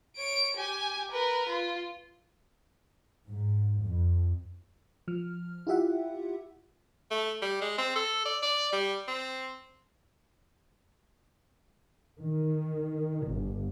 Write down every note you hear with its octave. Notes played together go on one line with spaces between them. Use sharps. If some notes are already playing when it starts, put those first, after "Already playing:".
C#5 D7
G4 G#5
A#4 B4
F4
G#2
F2
F3 F6
E4 F4 G4 E5 F#5
A3
G3
G#3
C4
A4
D5
D5
G3
C4
D#3
G1